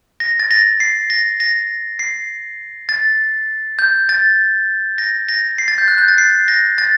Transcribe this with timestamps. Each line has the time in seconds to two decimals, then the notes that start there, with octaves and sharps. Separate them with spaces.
0.20 A#6
0.39 A6
0.51 A#6
0.80 C7
1.10 A#6
1.40 A#6
1.99 C7
2.89 A6
3.79 G6
4.09 A6
4.98 A#6
5.29 A#6
5.58 C7
5.68 A6
5.78 G6
5.88 F#6
5.98 G6
6.08 A6
6.18 C7
6.48 A#6
6.78 A6